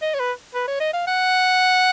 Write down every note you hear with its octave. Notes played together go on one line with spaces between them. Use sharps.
D#5
C#5
B4
B4
C#5
D#5
F5
F#5